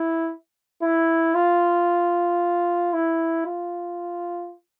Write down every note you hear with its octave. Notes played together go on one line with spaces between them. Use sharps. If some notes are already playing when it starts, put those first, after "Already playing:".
Already playing: E4
E4
F4
E4
F4